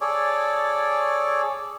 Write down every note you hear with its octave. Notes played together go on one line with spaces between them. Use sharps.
G#4 A4 C#5 D5